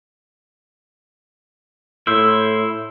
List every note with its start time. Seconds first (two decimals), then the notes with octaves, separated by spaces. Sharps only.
2.07 A2 E4 C5 E5